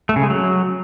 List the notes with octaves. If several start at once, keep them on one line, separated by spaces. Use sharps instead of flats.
A3
C#3
G#3
F#3